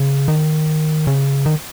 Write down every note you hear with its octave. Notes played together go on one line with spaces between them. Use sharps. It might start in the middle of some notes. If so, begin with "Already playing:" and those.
Already playing: C#3
D#3
C#3
D#3